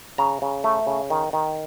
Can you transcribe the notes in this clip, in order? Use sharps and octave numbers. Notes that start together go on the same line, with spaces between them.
C#3 A#5
C#3
A3
C#3
D#3
D#3